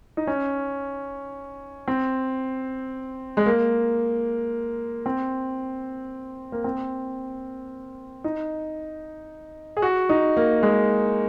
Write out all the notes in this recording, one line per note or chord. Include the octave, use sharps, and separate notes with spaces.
D#4
C#4
C4
G#3
A#3
C4
A#3
C4
D#4
G#4
F#4
D#4
A#3
G#3